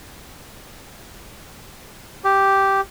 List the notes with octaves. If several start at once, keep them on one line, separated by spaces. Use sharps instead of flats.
G4